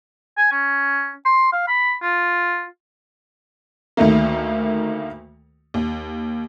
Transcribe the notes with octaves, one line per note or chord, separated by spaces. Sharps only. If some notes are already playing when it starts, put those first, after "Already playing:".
G#5
C#4
C6
F5
B5
F4
D2 D#3 A3 A#3
D#2